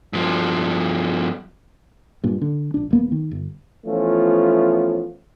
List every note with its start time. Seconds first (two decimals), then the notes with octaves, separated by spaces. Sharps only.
0.13 G2 F3
2.24 G2 A#2
2.42 D3
2.74 A#1 D4
2.91 D#1 A#3 B3
3.12 D#3
3.31 G1
3.86 E3 F3 A3 B3 C#4 F4